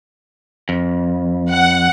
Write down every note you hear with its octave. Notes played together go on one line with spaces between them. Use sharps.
F2
F#5